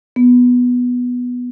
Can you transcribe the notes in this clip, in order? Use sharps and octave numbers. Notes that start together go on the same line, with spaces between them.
B3